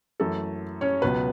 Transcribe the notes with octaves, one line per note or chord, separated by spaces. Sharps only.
F#2 E3 A3 A4
C#4 C#5
C#2 B2 F#3 B3 B4